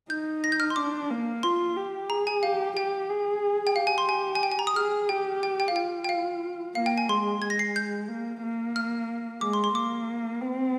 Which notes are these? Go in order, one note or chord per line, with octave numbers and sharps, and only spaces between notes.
D#4 G6
A#6
G6
F6
C6
D4 D6
A#3
F4 C6
G4
G#4 A#5
G#5
G4 F5
G4 G5
G#4
G5
G4 F5
G#5
C6
G#5
G#5
G5
G#5
A#5
D#6
G#4 F6
G4 G5
G5
G5
F5
F4 G5
G5
F5
A#3 F5
G5
G#5
G#3 C6
G#3 G#6
A#6
C7
G6
A#3
A#3
F6
G#3 D6
C6
C6
A#3 D6
C4